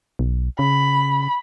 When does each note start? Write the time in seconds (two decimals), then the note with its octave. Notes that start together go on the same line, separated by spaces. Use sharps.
0.19 B1
0.59 C#3 B5